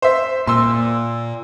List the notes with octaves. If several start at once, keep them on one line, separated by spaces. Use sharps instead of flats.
C5 E5
A#2 C6 E6